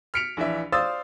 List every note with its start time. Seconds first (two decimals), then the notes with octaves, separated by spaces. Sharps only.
0.14 F6 B6 C#7 D7 F7
0.37 A#1 E3 D4 E5
0.72 C5 D5 F5 D#6 E6 A6